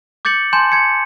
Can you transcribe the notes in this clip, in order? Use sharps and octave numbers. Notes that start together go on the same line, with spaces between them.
D6 G6 A6 C#7 F#7
G#5 A5 C6 G6 E7
C6 G#6 C#7